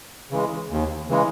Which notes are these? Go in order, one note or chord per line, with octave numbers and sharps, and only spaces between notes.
C#3 E3 G#3
D#2
C#3 E3 G#3